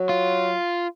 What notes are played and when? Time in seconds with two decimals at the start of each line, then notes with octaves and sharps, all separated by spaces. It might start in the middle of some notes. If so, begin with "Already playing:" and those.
Already playing: F#3
0.09 F4